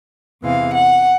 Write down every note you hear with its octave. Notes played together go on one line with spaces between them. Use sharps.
E2 C3 E3 G#3 F5
F#5